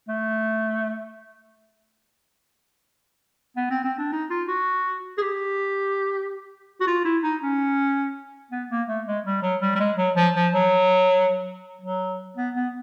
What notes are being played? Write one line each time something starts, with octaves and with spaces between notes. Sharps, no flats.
A3
B3
C4
C4
D4
D#4
F4
F#4
G#4
G4
F#4
F4
E4
D#4
C#4
B3
A#3
A3
G#3
G3
F#3
G3
G3
G#3
F#3
F3
F3
F#3
F#3
B3
B3